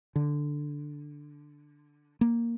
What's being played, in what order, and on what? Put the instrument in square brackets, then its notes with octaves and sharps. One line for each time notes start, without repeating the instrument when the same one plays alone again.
[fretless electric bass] D3
A#3